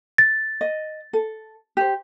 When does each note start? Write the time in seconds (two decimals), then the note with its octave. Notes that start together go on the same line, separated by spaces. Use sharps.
0.18 A6
0.61 D#5
1.13 A4
1.77 G4 C5